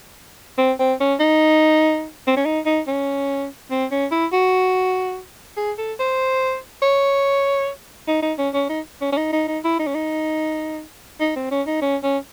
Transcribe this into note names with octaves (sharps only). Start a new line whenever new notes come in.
C4
C4
C#4
D#4
C4
C#4
D#4
D#4
C#4
C4
C#4
E4
F#4
G#4
A4
C5
C#5
D#4
D#4
C#4
C#4
D#4
C#4
C#4
D#4
D#4
D#4
E4
D#4
C#4
D#4
D#4
C4
C#4
D#4
C#4
C#4